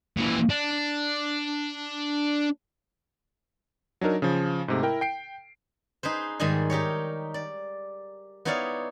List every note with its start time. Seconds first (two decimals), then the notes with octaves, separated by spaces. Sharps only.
0.17 A#2 E3
0.49 D4
4.01 F#3 D4 D#4 A#4
4.22 C#3 F3
4.68 G#2 C3 A3
4.83 E4 A#4 G5
5.01 G5 C7 D7
6.03 D#4 G#4 B4 C5
6.40 G#2 D#3 G3 G#4 D#5 G#5
6.70 D#4 G4 A#4 C#5
7.34 D5
8.45 B3 D#4 E4 C#5 D5 F5